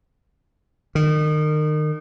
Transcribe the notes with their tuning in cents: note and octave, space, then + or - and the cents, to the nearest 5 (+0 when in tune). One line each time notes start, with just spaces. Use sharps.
D#3 -30